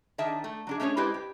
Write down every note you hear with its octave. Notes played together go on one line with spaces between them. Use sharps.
D#3 D4 G#4 E5 A5
A3
F#3 D4 G#4
A3 C#4 D4 G#4 C#5
G#3 E4 G4 B4 C5 D5
G4